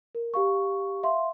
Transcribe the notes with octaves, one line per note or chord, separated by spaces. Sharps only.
A#4
G4 F5 C#6
E5 F5 C6